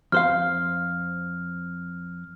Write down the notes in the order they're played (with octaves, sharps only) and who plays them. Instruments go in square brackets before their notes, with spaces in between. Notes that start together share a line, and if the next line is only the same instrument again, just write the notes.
[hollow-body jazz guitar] F2 C5 F5 [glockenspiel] F6